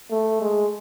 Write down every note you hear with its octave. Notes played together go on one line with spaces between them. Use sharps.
A3
G#3